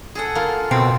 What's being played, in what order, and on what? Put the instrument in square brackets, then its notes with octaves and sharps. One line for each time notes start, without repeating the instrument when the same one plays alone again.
[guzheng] G#4 A4 F#5
A#3 F4
[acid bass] B2 [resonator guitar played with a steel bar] C4